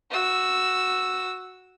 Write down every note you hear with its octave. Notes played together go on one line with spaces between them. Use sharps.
F#4 E6